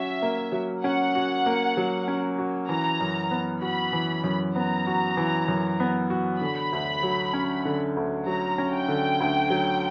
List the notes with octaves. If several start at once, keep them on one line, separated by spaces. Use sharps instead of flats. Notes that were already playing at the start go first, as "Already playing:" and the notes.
Already playing: F#3 C#4 F#4 E5
A#3
F#3
C#4 F#5
F#4
A#3
F#3
C#4
F#4
E3 A#5
F#2
B3
F#4 B5
E3
F#2
B3 A#5
F#4
E3
F#2
B3
F#4
D3 B5
D2
F#3
C#4
D3
D2
F#3 A#5
C#4
G5
D3
D2
F#3